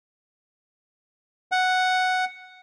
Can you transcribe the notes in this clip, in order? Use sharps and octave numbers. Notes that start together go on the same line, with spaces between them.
F#5